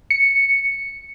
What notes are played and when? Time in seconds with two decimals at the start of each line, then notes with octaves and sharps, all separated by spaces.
0.11 C#7